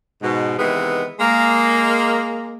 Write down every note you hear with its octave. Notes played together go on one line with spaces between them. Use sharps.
G#2 B2
C3 D#3 E3 G#3 B3
G#3 A#3